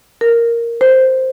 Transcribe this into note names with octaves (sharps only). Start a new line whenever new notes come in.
A#4
C5